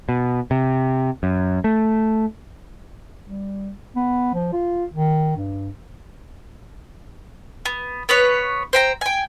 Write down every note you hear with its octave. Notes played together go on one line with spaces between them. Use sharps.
B2
C3
F#2
A3
G3
B3
F3
F4
D#3
G2
B3
B3 B4 C#5
C5 G5 A#5
G5 G#5